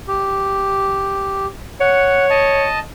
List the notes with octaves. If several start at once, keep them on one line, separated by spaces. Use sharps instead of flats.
G4
C#5 F#5
D#5 A5